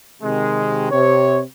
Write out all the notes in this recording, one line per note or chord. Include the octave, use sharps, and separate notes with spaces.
C3 D#3 G#3
C3 C#5